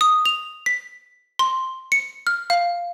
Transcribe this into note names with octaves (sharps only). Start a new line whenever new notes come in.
D#6
F7
B6
C6
C#7
F6
F5